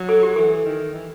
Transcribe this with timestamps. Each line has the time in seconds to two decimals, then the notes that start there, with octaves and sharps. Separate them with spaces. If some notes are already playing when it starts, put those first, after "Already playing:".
Already playing: F#3
0.09 A4
0.23 G4
0.36 E3 A4
0.65 D#3
0.94 E3